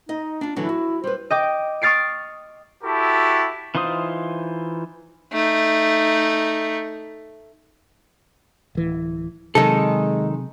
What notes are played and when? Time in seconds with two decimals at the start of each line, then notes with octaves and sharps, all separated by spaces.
0.09 D#4 D#5
0.41 D4 F4
0.56 D3 E3 F#3 E4
0.69 F#4
1.04 G3 B4 C5
1.30 D#5 G5 D6
1.82 C#6 D#6 F6 A6 C7 D7
2.84 E4 F#4 G4 A4
3.75 E3 D#4 F4 C5 D#6
5.32 A3 D#4
8.75 D1 E3
9.55 C3 D#3 F#3 G#3 D#4 A4